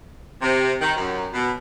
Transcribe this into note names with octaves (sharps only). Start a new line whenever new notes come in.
C3
D#3
F#2
B2